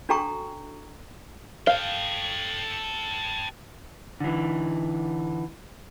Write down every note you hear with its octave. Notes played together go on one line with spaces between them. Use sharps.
D4 F#4 A4 G5 A#5 C#6
A4 F5 G5
D3 E3